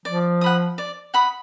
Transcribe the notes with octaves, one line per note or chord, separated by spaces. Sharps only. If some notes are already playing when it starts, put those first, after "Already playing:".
F3 D5
F#5 B5 D#6
D5
F#5 B5 D#6